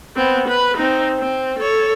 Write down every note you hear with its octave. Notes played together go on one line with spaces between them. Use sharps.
B3 C4
B4
C4 D#4
C4
A4 C#5